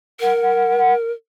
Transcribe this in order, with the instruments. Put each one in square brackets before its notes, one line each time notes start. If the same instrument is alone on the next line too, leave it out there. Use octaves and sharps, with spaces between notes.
[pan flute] A#4 [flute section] F#5